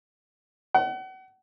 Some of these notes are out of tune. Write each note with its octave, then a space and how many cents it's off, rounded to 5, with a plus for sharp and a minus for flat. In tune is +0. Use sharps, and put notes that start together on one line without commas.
F#5 +35